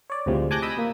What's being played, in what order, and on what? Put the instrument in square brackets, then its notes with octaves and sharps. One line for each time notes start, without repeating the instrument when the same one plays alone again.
[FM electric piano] C#5 D5
D2 A2 C3 F3 G3 G#3
G#5 A5 D6 F#6 G6 A#6
D#5 B5 D#6 E6
A#2 A#3